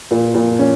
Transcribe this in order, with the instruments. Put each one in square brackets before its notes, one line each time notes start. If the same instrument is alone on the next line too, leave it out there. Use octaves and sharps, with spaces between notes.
[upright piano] A#2
A#2
C#4